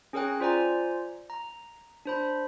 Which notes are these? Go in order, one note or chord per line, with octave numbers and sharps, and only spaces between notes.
C#4 G#4 A#4 C#5 G5 F#6
F4 C5 D5 G#5 A#5
A#5
D4 C5 B5